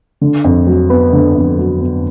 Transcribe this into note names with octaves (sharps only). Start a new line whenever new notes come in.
D3
F2
F#3
B3
D3
F2
F#3
B3